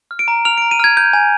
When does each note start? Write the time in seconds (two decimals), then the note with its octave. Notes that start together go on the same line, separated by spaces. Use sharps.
0.11 F6
0.19 D7
0.28 A#5
0.45 F6 F7
0.58 D7
0.62 A#5
0.71 D#7
0.80 F6 G#6
0.97 G6
1.13 G#5